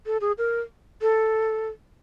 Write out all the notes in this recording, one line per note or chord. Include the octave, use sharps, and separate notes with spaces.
A4
G#4
A#4
A4